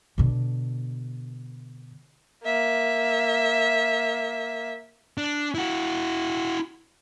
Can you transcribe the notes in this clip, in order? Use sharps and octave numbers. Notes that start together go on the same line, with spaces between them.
B2 D3
A#3 E5
D4
E4 F#4